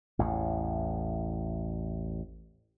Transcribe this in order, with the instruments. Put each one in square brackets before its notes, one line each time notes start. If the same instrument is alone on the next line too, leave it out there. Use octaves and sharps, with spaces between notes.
[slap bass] A1 E2 A2